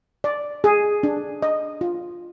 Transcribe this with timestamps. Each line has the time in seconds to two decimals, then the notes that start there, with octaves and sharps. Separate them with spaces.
0.24 D5
0.64 G#4
1.03 D4
1.42 D#5
1.81 F4